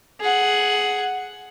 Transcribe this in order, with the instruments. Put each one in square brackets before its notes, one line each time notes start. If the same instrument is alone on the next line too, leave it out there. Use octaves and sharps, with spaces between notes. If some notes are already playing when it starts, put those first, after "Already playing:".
[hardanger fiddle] G#4 F#5